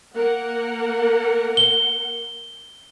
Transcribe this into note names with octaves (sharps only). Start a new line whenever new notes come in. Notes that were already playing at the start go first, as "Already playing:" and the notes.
A#3 A#4 F#5
G7